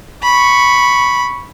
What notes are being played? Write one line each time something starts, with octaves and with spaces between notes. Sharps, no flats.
B5 C#6